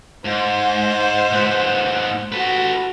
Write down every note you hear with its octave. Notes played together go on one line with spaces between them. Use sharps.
G#2 C5
G#2 B3
F#4 A4 B4